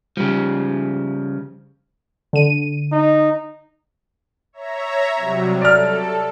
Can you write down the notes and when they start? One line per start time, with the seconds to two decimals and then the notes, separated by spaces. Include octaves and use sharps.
0.17 C#3 F3 G3 G4
2.33 D3 D#7
2.92 D#4
4.53 C#5 E5 A#5
5.16 C3 F#3 G3
5.61 A4 D5 F6